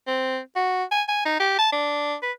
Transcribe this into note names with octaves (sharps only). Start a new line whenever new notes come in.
C4
F#4
G#5
G#5
D#4
G4
A5
D4
B4